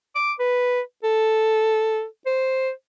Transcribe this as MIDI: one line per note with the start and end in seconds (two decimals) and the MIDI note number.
0.15 0.32 86
0.39 0.81 71
1.03 2.05 69
2.26 2.71 72